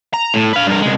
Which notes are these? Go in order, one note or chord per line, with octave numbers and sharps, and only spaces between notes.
A#5
A2
B4 F5
G2 A#4
C2 G#3